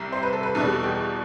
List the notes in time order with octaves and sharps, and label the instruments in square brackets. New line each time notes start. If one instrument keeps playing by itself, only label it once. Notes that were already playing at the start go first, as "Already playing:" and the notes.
Already playing: [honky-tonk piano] C2 C3 G3
C5
B4
A4
B4
E2 B2 G3 A4
G4